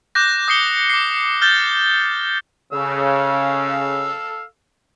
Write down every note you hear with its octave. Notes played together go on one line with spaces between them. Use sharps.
D6 F#6 G6 A#6
D#6 G6 C7 C#7 G7
D6 C7
F6 G6 A6 G7
C#3 A4 F5 E6